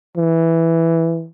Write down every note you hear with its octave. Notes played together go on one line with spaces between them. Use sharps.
E3